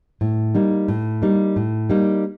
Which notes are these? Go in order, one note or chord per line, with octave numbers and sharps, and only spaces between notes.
A2
G3 A#3 D#4
A2
G3 A#3 D#4
A2
G3 A#3 D#4